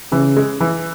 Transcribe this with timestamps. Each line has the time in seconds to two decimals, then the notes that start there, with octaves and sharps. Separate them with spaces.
0.12 C#3 E3
0.36 G#3
0.60 E3